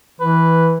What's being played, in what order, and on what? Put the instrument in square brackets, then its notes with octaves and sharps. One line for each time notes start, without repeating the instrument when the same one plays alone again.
[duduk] E3 [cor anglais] B4